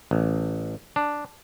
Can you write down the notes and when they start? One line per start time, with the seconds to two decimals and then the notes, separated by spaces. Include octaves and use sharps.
0.11 A1
0.96 D4